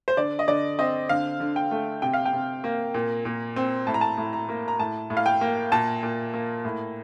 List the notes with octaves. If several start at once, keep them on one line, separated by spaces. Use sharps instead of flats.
C5
D3 D5
D#5
D3 D5
C4 D#5
D3 F5
D3
G5
A3
C3 G5
F5
G5
C3
A#3
A#2
A#2
C4
A2 A5
A#5
A5
A2
A#5
A#3
A#5
A2 A5
A2
F5
G5
A#3
A#2 A5
A#2
A#3
A2